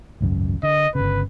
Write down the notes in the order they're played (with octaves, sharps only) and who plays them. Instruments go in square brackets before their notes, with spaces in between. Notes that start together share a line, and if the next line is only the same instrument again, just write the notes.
[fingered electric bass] G#1 C#2 F#2
[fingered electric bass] D3 [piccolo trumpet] D#5
[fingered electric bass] G1 C#3 [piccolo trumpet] B4